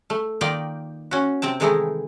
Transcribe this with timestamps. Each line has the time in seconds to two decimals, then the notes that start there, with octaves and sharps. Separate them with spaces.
0.10 A3
0.41 D#3 A#3 D#4 F4 D5 G5
1.11 C#4 F#4
1.42 C3 C4 G5 A5
1.60 D#3 E3 G#3 A3 D#4 E4